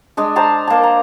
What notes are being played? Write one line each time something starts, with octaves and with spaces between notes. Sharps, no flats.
G#3 D4 D#5
C5 A5 A#5 C6
A#3 A5
A#5